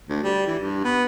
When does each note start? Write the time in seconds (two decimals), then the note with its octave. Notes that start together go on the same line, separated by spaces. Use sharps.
0.09 D2
0.23 G3
0.46 E3
0.59 G2
0.84 B3